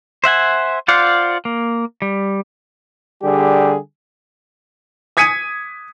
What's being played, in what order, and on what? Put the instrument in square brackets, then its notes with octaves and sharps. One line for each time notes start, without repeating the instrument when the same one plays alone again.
[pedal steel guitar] C5 E5 F#5 G#5
F4 C5 D5 F5 F#5
A#3
G3
[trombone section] D3 G3 G4 G#4
[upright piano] D#6 G#6 B6 C#7 D#7